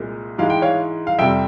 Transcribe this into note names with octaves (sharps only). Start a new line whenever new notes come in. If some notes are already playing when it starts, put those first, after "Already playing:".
Already playing: C2 A#2 G#3
G#2 E3 G#3 F5
G5
C#5 F5
F5
F2 C3 G3 E5 G5